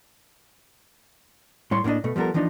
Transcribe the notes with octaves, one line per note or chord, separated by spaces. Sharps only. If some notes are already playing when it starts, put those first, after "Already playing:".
A2 G3 C#5 C6
A2 A#3 C#4 D4 D#5
B2 A3
F3 G3 B3 A4 A#4
E3 F3 A#3 D4 D#4